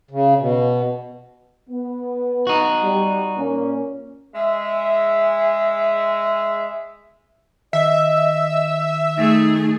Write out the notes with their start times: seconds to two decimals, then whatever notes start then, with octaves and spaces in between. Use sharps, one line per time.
0.11 C#3
0.38 B2
1.69 B3
2.47 D#4 F#4
2.83 G3
3.37 A#2 A#3 C#4
4.35 G#3 E5
7.73 D#3 D#5 E5
9.17 A3 D#4 G#4